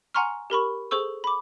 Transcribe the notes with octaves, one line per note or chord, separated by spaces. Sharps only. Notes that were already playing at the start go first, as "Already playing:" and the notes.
F#5 G#5 A#5 C6 C#6 F6
G4 A#4 B5 C#6
G#4 A4 C5 C#6 E6
B5 D6